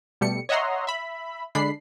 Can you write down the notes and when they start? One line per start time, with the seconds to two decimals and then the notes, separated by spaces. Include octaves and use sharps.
0.21 B2 G3 A3 C#7
0.49 C#5 D#5 E5 F#5 A#5 C6
0.87 E5 B5
1.55 D3 G#3 D4 B5 C7